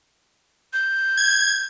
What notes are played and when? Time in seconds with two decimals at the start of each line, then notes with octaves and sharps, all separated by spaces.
0.73 G6
1.17 G#6